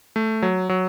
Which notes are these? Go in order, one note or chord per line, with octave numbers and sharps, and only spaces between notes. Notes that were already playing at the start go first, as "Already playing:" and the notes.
A3
F#3
F#3